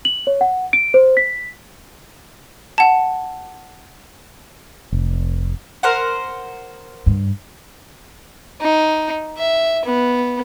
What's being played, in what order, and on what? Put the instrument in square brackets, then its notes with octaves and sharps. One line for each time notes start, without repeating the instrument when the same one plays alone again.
[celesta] F#7
C#5
F#5
D7
C5
B6
[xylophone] F#5 A5
[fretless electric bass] F1
[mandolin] A#4 C5 F#5
[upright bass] G2
[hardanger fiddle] D#4
E5
B3